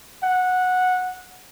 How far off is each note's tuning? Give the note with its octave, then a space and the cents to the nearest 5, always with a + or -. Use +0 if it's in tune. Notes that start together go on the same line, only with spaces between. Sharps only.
F#5 -15